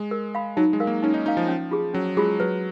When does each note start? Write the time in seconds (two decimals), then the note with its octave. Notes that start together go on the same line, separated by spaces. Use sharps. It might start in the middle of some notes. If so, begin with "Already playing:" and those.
Already playing: G#3
0.11 A#4
0.35 F5 B5
0.57 F#3 D#4
0.73 G#3
0.80 A#4 F5
0.87 A#3
1.03 C#4 D#4
1.14 D#4
1.26 D#4 A#4 F5
1.37 F3
1.48 C#4
1.71 F4 G#4
1.94 F#3 C#4
2.17 G#3 F4 G#4
2.40 F#3 B4